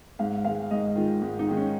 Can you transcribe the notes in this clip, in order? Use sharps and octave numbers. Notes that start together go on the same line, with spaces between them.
G#2 F5
D#3 G#3 F5
G#2 D#5
D#3 G#3 F4
G#2
D#4
D#3 G#3
C#4